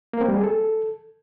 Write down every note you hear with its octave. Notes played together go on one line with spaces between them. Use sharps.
A#3
C4
G3
G#4
A4